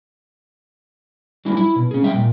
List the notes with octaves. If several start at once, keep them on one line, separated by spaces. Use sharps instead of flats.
F#3 G3 D4 E4
E4
B2
C#4 G#4
G3 E5 F5 G5
A#2